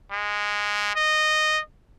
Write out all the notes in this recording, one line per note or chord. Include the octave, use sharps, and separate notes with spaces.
G#3
D#5